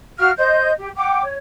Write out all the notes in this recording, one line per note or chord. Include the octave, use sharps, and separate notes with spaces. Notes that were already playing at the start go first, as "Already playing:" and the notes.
F#4 F5 F6
C5 D#5 G6
G4
F#5 G5 D6
C#5